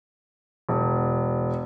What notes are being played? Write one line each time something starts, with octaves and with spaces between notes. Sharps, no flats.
E1